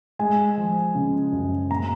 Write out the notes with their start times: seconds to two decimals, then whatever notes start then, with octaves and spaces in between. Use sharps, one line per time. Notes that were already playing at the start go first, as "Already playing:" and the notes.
0.19 G#3 G#5
0.57 F3
0.95 C#3
1.32 F#2
1.70 A#2 A#5